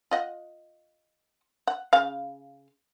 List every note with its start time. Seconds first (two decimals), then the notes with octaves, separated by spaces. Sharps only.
0.11 F4 D#5 F#5
1.68 F#5
1.93 C#3 F5